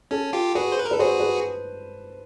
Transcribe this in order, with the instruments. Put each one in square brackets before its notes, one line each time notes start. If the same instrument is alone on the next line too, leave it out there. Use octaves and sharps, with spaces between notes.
[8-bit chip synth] C#4 [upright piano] A4
[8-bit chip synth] F4 G4
[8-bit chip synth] F#4 G#4 [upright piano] B4
[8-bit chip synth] C5
B4
A#4
[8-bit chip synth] A4 [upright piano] B4
[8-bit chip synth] F#4 G#4 [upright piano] C5
[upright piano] B4